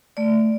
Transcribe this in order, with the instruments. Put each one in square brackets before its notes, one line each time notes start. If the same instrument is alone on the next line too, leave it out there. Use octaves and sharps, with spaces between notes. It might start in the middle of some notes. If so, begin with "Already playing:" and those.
[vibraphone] A3 D5